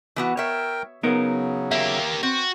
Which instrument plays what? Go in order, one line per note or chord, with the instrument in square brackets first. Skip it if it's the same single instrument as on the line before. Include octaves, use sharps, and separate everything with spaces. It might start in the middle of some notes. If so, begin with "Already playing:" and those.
[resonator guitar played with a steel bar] E3 B3 F#4
[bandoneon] A#4 G5 [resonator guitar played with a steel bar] C#5 E5
[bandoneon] C#3 F#3 [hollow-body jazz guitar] B3 D#4 A#4
[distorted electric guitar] A#3 G4 [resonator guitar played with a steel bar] E5
[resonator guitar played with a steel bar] C4 [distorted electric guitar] F#4